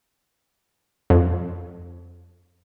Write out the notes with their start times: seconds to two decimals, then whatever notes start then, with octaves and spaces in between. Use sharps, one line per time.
1.10 F2